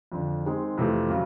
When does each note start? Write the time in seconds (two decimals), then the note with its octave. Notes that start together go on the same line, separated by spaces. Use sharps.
0.12 F2 D3 F3
0.45 D#3 G#3 C4
0.78 F2 C3 E3 A3
1.10 C#3 F#3